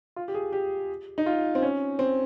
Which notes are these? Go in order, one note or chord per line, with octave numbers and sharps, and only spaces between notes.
F4
G4
G#4
G4
D#4
F4
C4
C#4
C4